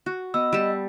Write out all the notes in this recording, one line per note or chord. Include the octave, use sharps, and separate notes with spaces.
F#4
B3 D#5 E6
G3 A5